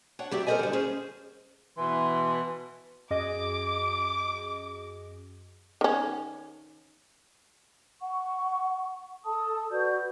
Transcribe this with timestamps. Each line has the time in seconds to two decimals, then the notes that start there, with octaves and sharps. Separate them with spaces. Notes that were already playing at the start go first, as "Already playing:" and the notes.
0.19 D4 C#5 F#5 G5
0.31 F#3 G4 D5 E5
0.47 A4 A#4 C5 D5 D#5 G#5
0.59 D3 G3
0.73 C#4 G#4 C5
1.78 B2 E3 C6
3.11 F#2 G#4 D#5 D6
5.81 D#3 C#4
8.01 F#5 C#6
9.25 A4 A5 D#6
9.71 F#4 B4 D5 G6